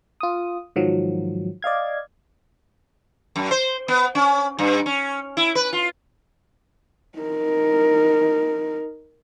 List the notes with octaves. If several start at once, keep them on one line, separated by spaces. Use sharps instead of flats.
F4 D#6
G#2 D#3 F3 F#3
D5 D#5 F5 G#6
F#2
C5
B3
C#4
G2
C#4
E4
B4
F4
D#4 A#4